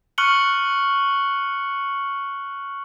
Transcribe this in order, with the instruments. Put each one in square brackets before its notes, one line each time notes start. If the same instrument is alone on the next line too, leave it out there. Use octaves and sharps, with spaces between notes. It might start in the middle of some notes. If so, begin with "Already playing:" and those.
[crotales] C#6 F6 F#6 C#7 F#7 G7